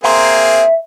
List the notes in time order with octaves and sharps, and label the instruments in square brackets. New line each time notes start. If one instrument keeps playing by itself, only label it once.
[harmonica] A#3 C4 G#4 [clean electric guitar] E5 A#5 C6